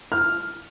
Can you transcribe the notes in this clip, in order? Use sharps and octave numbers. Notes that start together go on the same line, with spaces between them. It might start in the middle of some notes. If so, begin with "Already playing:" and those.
F6